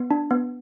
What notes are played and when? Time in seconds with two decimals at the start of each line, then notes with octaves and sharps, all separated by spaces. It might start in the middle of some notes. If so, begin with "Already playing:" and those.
Already playing: B3
0.11 D4
0.31 B3